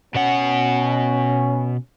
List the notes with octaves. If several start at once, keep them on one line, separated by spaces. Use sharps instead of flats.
B2 C#4 F#5